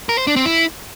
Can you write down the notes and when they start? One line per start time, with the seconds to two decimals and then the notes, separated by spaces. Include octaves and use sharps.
0.09 A#4
0.18 C5
0.27 D4
0.36 C4
0.45 E4